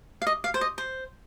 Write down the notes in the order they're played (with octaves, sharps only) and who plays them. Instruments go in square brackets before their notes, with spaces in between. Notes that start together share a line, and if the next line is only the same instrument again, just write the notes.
[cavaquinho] F5
D#5
F5
C5
D#5
C5